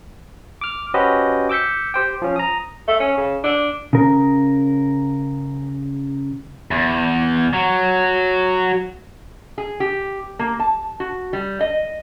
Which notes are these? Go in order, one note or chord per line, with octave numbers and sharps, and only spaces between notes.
D6 F6
C#4 F#4 G4 B4 C5 D#5
D6 E6 G6 B6 C#7
G4 C5 G5
F3 C#4
A#5 D#6
A3
C#4
C#3
D4
C#3 A#4
E2
F#3
G#4
G4
A#3
A5
F#4
G3
D#5